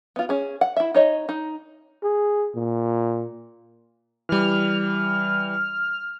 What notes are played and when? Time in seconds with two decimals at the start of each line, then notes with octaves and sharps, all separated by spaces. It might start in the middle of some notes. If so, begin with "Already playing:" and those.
0.16 B3 F4
0.29 C#4 G#4
0.61 F#5
0.76 E4 E5
0.94 D#4 C#5 D#5
1.29 D#4
2.03 G#4
2.55 A#2
4.29 E3 G3 F6